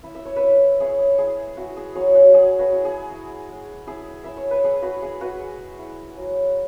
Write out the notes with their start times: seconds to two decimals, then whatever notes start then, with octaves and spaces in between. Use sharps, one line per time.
0.03 E4
0.15 E5
0.25 C#5
0.36 B4 E5
0.43 E4
0.80 E4 G#4 C#5
1.18 E4 G#4
1.57 E4 F#4
1.76 G#4
1.95 F#3 G#4 C#5
2.15 F#4
2.34 F#3 G#4
2.59 F#4 B4
2.72 E4
2.85 G#4
3.11 E4
3.49 G#3
3.87 E4 G#4
4.24 E4 E5
4.37 C#5
4.51 B4
4.63 E4 G#4
4.82 F#4 B4
5.02 E4 G#4
5.21 F#4 B4
5.40 G#3
5.78 E4
6.17 F#3